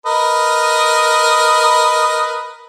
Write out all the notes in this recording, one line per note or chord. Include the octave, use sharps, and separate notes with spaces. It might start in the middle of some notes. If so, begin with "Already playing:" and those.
A#4 B4 D#5